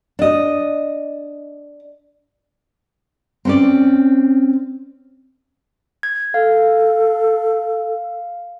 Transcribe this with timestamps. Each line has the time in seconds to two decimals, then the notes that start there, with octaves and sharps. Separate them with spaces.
0.19 D4 D#5
3.45 C4 C#4 D5
6.03 G#6
6.34 A4 F5